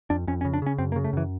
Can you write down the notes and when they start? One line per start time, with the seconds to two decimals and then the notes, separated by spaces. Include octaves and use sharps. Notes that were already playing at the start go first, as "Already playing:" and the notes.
0.10 F2 D4
0.27 F2 C#4
0.41 C#4
0.45 C#3
0.54 D4
0.62 C#3 C#4
0.78 F#2 C4
0.92 A#3
0.96 C#3
1.04 A3
1.13 F#2 E3